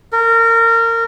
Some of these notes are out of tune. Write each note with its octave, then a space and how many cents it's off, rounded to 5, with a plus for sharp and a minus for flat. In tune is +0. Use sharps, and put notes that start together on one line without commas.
A#4 -25